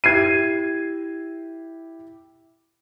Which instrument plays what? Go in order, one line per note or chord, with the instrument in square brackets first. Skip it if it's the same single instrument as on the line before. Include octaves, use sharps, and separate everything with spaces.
[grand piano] E4 G4 [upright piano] G#6 C7 D#7